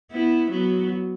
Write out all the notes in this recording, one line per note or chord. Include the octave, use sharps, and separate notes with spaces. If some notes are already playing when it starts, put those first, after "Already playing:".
B3 E4
F#3 B3